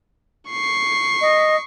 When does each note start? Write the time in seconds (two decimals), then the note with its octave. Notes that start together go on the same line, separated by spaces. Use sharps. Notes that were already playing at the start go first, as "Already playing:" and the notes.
0.50 C#6 C7
1.21 D#5